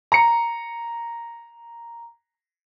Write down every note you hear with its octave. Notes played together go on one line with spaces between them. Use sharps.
A#5 C#7